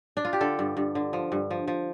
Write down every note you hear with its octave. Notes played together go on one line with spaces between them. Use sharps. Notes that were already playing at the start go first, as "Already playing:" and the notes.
D4
F4
G4
D3 A4
G2
G2
D3
F3
G2
F3
F3